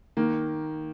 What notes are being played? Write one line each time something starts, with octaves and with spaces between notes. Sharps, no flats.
D#3 A#3